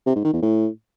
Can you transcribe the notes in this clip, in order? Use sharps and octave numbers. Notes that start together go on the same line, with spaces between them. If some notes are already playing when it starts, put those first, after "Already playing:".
C3
G#2
D#3
E2
A2